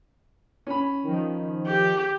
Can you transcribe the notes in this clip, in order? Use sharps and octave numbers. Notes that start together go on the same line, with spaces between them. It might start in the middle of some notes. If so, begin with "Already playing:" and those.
C#4 B5
D#3 F3
G4